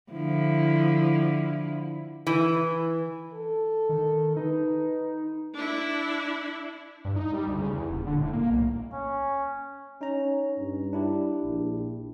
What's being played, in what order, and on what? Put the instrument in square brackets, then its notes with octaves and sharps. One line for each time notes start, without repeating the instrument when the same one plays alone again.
[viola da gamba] D3 F3 E4
[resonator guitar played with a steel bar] E3
[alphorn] A4
[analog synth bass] D#3
[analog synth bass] D#4 [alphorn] B4
[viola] D4 E4
[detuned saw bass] G2
D#4
G3
D2
C#3
E2
D#1
D3
A2
A#3
B1
[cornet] C#4
[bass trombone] C#4 [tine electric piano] D#4 A#5
[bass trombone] G2
[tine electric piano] D4 E4 G4
[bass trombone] A#1